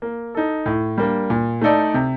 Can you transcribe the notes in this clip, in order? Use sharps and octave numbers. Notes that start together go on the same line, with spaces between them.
A#3
D#4 A4
A2
G3 A#3 D4
A#2
A3 D#4 A4 D5
C3